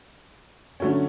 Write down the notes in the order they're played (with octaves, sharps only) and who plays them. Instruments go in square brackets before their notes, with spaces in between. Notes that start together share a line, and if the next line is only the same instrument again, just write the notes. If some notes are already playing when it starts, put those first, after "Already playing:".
[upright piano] D3 F#3 A3 C#4